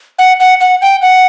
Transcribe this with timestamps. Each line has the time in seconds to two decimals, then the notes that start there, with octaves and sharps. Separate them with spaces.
0.19 F#5
0.40 F#5
0.61 F#5
0.82 G5
1.02 F#5